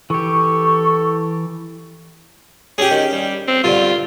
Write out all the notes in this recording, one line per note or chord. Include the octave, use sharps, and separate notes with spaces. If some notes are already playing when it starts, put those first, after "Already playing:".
E3 G4 A4 C#6
C#4 G4 G#4
D#3
G3
C4
G2 D3 F4